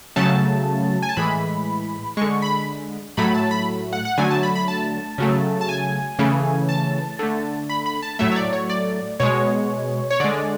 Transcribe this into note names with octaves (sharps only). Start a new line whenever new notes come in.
C#3 F#3 A3 A5
G#5
A5
A2 E3 G#3 B5
D3 G#3 C#6
B5
A2 F#3 A3 B5
A5
B5
F#5
F#5
D3 F#3 A3 G#5
A5
B5
B5
A5
C#3 F#3 A3
A5
G#5
C#3 E3 A3
A5
D3 A3
B5
B5
A5
A2 F#3 A3 E5
C#5
D5
C#5
D5
B2 G#3 C#5
C#5
D3 G#3 D5